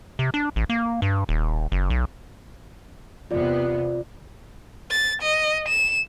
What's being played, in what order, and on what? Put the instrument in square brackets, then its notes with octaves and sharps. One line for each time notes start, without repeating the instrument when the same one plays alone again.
[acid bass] C3
D4
A1
A#3
G2
D#1
F#1
B1
[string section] E2 C3 B3 [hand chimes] F4 D5
[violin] A6
D#5
E7